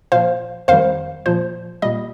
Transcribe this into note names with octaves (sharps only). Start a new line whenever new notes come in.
A#2 F3 C5 F5
F2 D#3 G3 C5 F5
A#2 F3 C5
A#2 G3 D#5